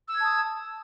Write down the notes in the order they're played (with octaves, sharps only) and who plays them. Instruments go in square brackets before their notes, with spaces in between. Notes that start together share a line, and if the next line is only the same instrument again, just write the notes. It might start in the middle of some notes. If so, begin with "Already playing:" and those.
[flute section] E6
G#6
A5
D#6